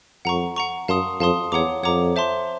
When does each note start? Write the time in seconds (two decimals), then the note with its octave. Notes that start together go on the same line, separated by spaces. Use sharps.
0.25 F2 F#5 A#5 C#6
0.56 F#5 A#5 C#6
0.88 F#2 F5 A5 C6 D#6
1.20 F2 F5 A5 C6 D#6
1.52 E2 C#5 F#5 A#5 D6
1.83 F2 C#5 F#5 A#5 D6
2.16 C5 E5 A5 C6